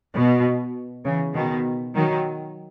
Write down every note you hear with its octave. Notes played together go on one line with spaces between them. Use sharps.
B2
C#3 E3
B2 D#3
D#3 F#3